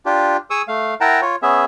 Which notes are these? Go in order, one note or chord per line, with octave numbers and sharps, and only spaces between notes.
D4 F4 G4
G#4 C#6 D#6 E6
A3 F5
E4 A#4 F#5 G5 A5 A#5
F4 C#5
B3 C#4 G#4 E5